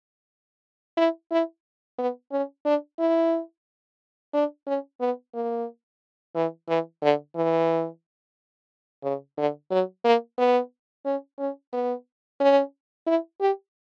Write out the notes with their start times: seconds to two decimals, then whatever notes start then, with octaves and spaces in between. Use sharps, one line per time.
0.97 E4
1.31 E4
1.98 B3
2.32 C#4
2.65 D4
2.99 E4
4.33 D4
4.67 C#4
5.00 B3
5.34 A#3
6.35 E3
6.68 E3
7.02 D3
7.36 E3
9.03 C#3
9.37 D3
9.71 F#3
10.04 A#3
10.38 B3
11.05 C#4
11.39 C#4
11.73 B3
12.40 C#4
13.07 E4
13.40 G4